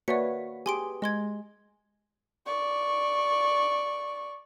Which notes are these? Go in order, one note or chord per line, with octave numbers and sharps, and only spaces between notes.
A#3 F#4 B4 C#5 D5 E5 C#7
G4 G#4 G#5 C6 D7
G#3 D#5 C6 G#6
D5 C#6